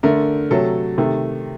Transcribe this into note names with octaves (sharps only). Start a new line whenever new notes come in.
D3 A3 A#4
C3 F#3 A3 A4
C3 D#3 A3